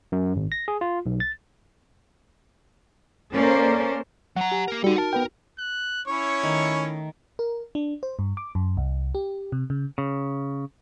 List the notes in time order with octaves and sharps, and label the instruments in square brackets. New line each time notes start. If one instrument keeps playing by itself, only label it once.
[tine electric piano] F#2
G#1
A#6
G#4
F4
B1
A6
[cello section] A#3 C#4 A4 A#4 C5 D5
[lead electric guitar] F#3 A#5 [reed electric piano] F#5
[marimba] G4 G#5
[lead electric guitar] A#3 A#4
[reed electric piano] G3 [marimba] D#4 F#4 [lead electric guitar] A4 F#5
[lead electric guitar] A#4 [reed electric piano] A5
[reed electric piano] B3 B4 G5
[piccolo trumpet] F#6
[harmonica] C#4 E4 C#5 [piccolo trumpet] C#6
[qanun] D#3 A3
[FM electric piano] A#4
D4
C5
G2
D6
F#2
C2
G4
C3
C#3
[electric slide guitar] C#3